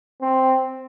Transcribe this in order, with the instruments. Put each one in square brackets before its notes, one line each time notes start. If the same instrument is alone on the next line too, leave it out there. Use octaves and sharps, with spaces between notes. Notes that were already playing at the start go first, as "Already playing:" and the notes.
[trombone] C4